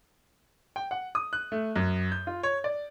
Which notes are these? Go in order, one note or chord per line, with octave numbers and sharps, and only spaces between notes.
G5
F#5
D#6
F#6
A3
F#2
G6
F4
C#5
D5